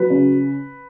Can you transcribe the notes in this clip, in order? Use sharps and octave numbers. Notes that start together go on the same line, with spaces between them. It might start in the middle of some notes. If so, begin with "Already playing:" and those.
Already playing: F#3 B4
C#3